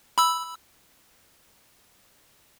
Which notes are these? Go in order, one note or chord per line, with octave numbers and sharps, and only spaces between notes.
B5 E6